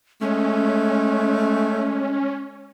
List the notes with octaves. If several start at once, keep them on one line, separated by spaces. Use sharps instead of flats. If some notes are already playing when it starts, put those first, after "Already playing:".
G#3 A3 C#4